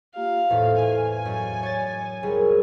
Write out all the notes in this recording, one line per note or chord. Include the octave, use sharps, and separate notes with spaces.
A#3 F4 G4 F5
E2 A2 A4 C5 D#5
G#5
F#2 D#5
C#5 G#6 A6
C2 G#4 A#4